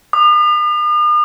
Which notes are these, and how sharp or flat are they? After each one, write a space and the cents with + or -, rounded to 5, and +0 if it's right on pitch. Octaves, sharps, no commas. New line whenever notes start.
D#6 -45